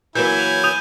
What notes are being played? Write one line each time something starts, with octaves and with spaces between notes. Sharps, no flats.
E3 F#3 A#3 E4 G#5 G6 E7 G7
F7
D#6 G6 D#7 F7